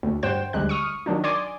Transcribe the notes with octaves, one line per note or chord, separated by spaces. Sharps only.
D2
G2 C5 F#5 G5 E7
D2 G3 G#3 F#6
C#6 D#6 F6
D#3 F#3 D4 D#4
D5 G#5 C6 D6 D#6